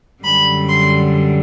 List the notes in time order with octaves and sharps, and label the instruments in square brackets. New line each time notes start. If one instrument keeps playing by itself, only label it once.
[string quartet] F#2 D3 G3 B5
C6